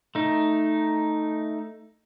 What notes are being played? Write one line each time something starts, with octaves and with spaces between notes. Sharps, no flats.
A3 D#4